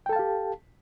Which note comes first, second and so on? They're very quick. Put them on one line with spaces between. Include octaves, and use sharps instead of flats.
G5 A4 A5 F5 G4